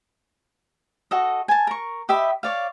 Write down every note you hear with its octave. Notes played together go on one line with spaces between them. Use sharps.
F#4 A4 D#5
G#5 A5
A#4 C#6
G4 D#5 E5 B5
C#5 D5 F5